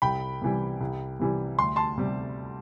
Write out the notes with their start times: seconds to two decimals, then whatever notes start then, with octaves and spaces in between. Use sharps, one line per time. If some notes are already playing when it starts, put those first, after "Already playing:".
0.02 C2 G5 B5
0.42 C3 E3 G3
0.81 C2
1.20 C3 E3 G3
1.59 D2 C6
1.76 A5 C6
1.98 C3 G3